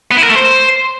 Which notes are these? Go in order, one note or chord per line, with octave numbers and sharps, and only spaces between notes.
B3
E4
A#4
A3
C5